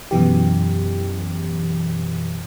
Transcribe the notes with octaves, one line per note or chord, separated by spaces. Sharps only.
F#2 B2 E3 G4